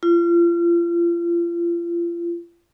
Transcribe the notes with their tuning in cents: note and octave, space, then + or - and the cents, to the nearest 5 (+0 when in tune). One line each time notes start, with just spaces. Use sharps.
F4 -35